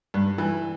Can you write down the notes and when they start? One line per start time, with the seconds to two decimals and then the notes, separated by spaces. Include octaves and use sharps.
0.14 G2
0.38 E3